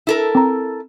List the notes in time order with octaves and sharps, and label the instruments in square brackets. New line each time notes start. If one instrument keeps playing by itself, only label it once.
[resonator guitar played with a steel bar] E4 A4 A#4
[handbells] C4 A#5